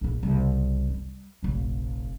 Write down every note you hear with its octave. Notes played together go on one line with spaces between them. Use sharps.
A#1 E4
C2 C#3
G3
F1 A#1